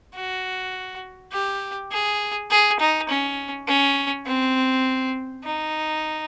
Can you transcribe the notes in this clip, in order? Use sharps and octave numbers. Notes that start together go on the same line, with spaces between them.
F#4
G4
G#4
G#4
D#4
C#4
C#4
C4
D#4